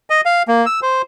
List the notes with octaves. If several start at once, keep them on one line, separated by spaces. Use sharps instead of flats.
D#5
F5
A#3
E6
C5